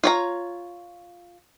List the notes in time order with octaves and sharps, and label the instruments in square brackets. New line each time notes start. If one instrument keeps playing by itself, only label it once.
[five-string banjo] F4 C#5 A#5